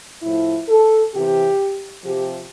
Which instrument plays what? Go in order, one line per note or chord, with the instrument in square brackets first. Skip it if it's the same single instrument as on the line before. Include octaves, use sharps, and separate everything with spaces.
[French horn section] A2 F3 E4
A4
C3 E3 G4
C3 F3 G4